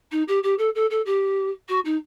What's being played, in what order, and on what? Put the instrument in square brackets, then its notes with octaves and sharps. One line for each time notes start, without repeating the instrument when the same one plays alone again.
[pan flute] D#4
G4
G4
A4
A4
A4
G4
F#4
D#4